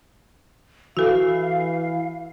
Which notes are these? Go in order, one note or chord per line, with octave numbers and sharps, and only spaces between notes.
E3 F#4 A4 F5